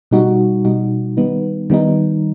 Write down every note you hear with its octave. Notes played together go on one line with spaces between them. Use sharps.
B2 G3 D#4 F#4
B2 G3 D#4 F#4
D#3 G3 B3 D#4
D#3 G3 B3 D#4